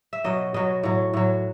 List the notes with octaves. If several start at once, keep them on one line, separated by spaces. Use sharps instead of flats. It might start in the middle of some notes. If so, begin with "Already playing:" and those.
E5
B2 F#3 D#5
B2 F#3 D#5
A2 F#3
A2 F#3